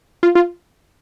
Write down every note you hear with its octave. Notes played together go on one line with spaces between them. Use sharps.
F4
F4